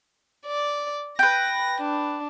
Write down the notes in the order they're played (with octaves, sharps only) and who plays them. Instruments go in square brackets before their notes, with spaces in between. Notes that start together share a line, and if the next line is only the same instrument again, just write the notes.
[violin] D5
[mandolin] B4 G5 [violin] A#6
[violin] D4